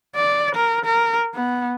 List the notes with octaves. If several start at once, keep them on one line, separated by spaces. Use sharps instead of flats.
D5
A#4
A#4
B3